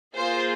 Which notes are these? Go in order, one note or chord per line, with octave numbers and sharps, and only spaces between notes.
A#3 F4 G#4 C5